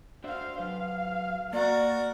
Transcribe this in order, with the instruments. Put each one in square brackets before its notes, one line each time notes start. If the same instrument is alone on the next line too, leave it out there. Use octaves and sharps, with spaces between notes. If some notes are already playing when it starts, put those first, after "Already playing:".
[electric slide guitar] D4 F#4 E5 [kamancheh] C5 F5
[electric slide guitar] F#3 B4 C5 [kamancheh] F5
[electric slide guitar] A#3 [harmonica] F#4 A#4 [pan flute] D5